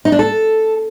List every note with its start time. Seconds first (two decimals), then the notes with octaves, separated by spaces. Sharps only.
0.05 D#4
0.12 D4
0.19 A4